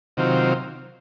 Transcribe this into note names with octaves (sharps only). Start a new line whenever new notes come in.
C3 D#3 F#3 C4 F4